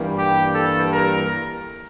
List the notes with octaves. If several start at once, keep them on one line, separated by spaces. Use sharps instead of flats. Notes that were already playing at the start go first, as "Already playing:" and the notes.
Already playing: G2 E3 G3 A#3
G4
A4
A#4